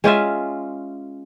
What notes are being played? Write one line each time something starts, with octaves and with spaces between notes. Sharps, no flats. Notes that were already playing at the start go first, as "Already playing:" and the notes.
G#3 C#4 F4 E5